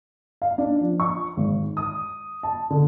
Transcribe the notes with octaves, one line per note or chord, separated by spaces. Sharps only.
F5
D4
F3
C#6
G#1
D#6
A5
D3